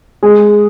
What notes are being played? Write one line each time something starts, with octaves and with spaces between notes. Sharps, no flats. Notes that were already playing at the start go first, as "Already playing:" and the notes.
G#3